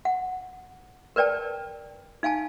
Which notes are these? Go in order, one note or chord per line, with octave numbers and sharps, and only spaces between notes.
F#5
A#4 B4 D5 G5 A5
D#4 F5 G#5 A5